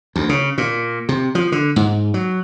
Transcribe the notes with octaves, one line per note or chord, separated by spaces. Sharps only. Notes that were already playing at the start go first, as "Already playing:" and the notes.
D2
C#3
A#2
C3
F3
D3
G#2
F#3